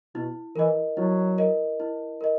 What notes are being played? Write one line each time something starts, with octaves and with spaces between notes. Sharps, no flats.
B2 E4
E3 A#4 D#5
F#3 E4
A#4 D#5
E4
A#4 D#5